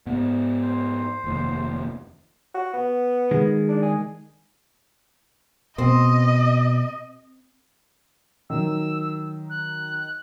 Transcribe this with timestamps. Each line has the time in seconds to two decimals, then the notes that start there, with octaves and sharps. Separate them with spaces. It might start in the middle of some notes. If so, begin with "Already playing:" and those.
0.06 G#2 B3
0.62 C5
1.24 F1 D#2
2.55 F#4
2.73 B3
3.31 D#3 G#3
3.69 D4
3.82 G#4
5.78 B2 C4 D#5
8.50 D#3 F#3 E6
9.50 F#6